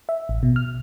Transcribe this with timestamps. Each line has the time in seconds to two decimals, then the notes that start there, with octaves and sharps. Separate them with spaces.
0.09 E5
0.29 A1
0.43 B2
0.56 F6